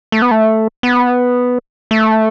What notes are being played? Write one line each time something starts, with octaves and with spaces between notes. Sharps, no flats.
A3
B3
A3
B3
A3